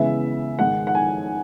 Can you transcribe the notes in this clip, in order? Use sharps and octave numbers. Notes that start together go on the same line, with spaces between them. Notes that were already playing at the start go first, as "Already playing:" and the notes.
Already playing: C#3 E3 G#3 B3 E5
G#2 D#3 G#3 F#5
F#5
G#5